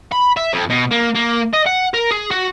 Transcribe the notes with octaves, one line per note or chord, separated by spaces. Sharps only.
B5
E5
F2
B2
A#3
A#3
D#5
F#5
A#4
G#4
F#4